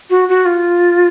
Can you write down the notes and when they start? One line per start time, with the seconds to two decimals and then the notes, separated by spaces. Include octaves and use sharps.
0.10 F#4
0.29 F#4
0.45 F4